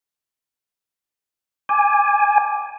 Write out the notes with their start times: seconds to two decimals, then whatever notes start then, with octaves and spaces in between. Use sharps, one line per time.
1.69 G#5 D6